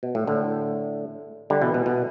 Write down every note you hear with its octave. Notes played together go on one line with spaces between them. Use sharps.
B2
A2
A2 D3
D3 G3
B2 E3
B2
B2